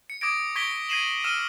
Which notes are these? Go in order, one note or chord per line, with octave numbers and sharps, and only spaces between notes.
C#7
D6 D#6 G#6 A#6 D7
C#6 G#6 A#6 B6 D7 G7
G#6 A#6 C7 D#7 E7 F#7
E6 F6 D#7 E7 G7